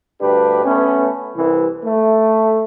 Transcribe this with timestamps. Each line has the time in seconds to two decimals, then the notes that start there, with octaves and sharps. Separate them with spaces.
0.21 D2 G2 D4 G4 B4
0.65 A3 B3 C#4
1.36 C2 E3
1.83 A3